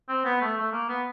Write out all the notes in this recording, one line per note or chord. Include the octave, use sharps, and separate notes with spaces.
C4
B3
A3
A3
A#3
B3